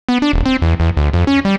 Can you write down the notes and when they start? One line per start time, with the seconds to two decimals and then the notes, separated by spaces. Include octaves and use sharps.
0.09 B3
0.22 D4
0.33 D#1
0.46 C4
0.62 E2
0.80 E2
0.97 D2
1.13 F2
1.27 C#4
1.45 G3